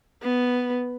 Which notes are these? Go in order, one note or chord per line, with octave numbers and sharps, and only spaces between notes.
B3